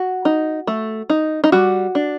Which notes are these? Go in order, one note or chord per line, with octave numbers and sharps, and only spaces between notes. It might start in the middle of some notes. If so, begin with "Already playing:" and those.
Already playing: F#4
D#4
A3
D#4
D#4
G3 F#4
D4